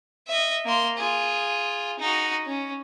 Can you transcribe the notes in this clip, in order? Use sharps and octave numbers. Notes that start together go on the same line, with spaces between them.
D#5 E5
A#3 C6
F4 G#4
D#4 F#4
C#4